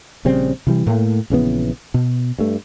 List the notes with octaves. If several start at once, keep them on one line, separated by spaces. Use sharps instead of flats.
A#1 C#3 G3 C4
C3 E3 G3
A2 A3 A#3
A#1 C#3 E3 B3
B2
G2 A3